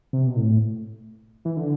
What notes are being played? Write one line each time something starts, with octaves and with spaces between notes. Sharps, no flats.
C3
B2
A2
E3
D3